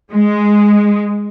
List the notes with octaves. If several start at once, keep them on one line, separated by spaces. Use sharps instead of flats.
G#3